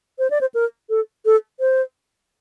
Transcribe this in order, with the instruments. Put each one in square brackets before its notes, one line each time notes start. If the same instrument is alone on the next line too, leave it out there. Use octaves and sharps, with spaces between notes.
[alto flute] C5
D5
C5
A#4
A4
A4
C5